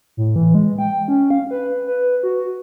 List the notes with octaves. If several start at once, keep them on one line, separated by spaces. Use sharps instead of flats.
A2
E3
G#3
G5
C#4
F5
B4
B4
B4
F#4